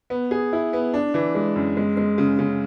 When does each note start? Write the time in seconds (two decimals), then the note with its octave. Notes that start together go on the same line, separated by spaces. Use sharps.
0.10 B3
0.31 G#4
0.53 E4
0.73 B3
0.94 D4
1.14 E3
1.35 G#3
1.56 F#2
1.77 G#3
1.97 G#3
2.18 C#3
2.39 C#3